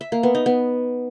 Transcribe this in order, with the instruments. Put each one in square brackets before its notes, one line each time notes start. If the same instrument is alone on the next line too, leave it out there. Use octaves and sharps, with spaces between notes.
[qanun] E5
A#3
B3
D#4
B3